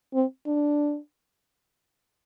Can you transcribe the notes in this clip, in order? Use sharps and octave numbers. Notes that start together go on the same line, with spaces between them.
C4
D4